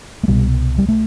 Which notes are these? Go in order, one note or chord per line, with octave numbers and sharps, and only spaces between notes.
A3
C2 B2 G3
G3
A3